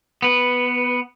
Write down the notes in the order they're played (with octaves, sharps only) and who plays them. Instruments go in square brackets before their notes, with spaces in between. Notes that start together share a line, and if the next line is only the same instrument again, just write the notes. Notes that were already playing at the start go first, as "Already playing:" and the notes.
[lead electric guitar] B3 B4